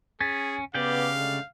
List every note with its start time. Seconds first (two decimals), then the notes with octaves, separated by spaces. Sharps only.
0.21 C#4 G#4 G#6 A6 B6
0.74 C#3 B3 G4 D5 F5 G6
1.16 D3 G#3 A3